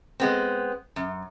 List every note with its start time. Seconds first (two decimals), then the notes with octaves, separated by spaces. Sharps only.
0.20 G#3 B3 C4
0.96 F#2